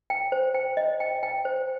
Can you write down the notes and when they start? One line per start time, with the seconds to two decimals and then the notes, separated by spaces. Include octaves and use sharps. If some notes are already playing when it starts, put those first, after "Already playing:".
0.10 G5
0.32 C5
0.54 G5
0.77 D#5
1.00 G5
1.23 G5
1.45 C5